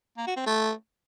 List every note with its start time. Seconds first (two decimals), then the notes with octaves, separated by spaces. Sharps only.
0.18 A#3
0.27 F#4
0.37 C4
0.47 A3